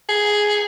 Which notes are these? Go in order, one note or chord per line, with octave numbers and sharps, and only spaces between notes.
G#4